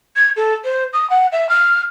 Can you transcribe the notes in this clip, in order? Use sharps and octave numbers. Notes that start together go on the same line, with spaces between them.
G#6
A4
C5
D#6
F#5
E5
F6